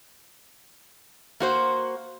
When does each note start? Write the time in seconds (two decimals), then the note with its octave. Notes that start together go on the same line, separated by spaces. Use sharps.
1.40 A#3 F#4 C5